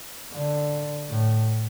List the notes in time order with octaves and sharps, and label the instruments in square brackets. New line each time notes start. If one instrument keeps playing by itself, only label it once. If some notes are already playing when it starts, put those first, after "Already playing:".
[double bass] D3
A2